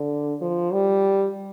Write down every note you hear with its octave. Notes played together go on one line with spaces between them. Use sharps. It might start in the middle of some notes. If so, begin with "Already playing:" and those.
Already playing: D3
F3
G3